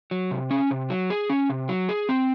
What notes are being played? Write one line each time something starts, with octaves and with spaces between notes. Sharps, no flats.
F#3
C3
C#4
C3
F#3
G#4
C#4
C3
F#3
G#4
C4